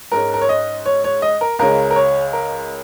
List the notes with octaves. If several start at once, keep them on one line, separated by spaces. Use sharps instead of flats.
G#2 G#3 C#4 A#4
A#4
C#5
D#5
C#5
C#5
D#5
A#4
C#2 C#3 G#3 C#4 A#4
A#4
C#5
A#4